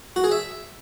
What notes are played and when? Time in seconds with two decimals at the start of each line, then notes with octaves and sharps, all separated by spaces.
0.16 F#4
0.24 G#4
0.31 E5